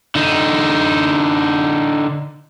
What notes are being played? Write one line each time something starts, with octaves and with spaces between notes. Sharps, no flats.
D3 D#4